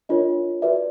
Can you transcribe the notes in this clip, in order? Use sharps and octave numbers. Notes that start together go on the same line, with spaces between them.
D4 F4 A#4 C#5 D#5
F#4 B4 D5 E5